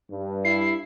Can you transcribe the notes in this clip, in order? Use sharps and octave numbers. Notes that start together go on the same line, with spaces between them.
G2
E4 C7